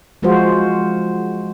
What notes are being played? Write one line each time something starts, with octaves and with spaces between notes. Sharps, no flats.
F3 G#3 F4 F#4 C5